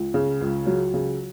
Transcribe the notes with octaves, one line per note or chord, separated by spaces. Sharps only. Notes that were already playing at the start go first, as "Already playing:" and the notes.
Already playing: C#2
C#3
C#2
F#3
C#3